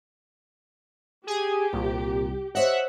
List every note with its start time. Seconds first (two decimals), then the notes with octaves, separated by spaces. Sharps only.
1.27 G4 G#4 G#5
1.73 C2 A#2
2.55 C5 C#5 D#5 E5 F#5